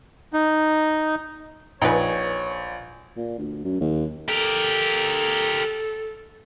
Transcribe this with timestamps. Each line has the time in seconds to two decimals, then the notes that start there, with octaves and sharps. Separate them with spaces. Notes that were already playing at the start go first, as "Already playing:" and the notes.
0.33 D#4
1.82 A#1 D#4 G#4 B4 C#5 G5
3.17 A#2
3.39 D2
3.64 F#2
3.81 D#2
4.29 G4 A4 A#4